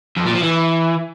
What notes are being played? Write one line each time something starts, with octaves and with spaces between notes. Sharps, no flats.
F2
A#2
F3
E3